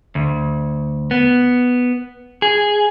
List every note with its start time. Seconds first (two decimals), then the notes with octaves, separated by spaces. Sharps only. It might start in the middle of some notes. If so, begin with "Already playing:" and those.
0.15 D2
1.11 B3
2.42 G#4